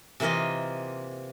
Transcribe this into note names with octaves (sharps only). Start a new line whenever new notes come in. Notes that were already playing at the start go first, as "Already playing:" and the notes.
C3 E3 A#3 F4 D#5